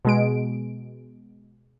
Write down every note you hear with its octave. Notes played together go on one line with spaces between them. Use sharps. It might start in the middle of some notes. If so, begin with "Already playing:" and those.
B2 G#3 D7